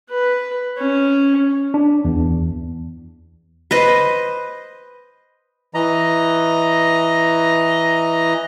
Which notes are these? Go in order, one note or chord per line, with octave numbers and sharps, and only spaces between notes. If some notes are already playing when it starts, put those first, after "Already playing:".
B4
C#4
D4
E2
B4 C5 D#5
E3 D#5 A#5